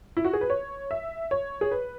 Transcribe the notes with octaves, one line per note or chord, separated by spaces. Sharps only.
E4
F#4
G#4
B4
C#5
E5
C#5
G#4
B4